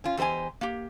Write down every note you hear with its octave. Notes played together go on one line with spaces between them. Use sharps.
C#4 F4
E2 G4 C5 D#5 G#5
A#3 G4